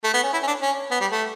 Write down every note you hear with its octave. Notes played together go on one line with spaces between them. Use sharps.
A3
B3
C#4
E4
C#4
D4
C#4
B3
G3
A3